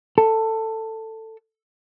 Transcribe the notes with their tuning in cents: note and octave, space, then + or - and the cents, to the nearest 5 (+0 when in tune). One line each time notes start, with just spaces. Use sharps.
A4 +15